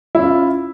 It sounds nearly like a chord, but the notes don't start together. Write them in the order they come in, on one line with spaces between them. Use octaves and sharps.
E4 C#4 F4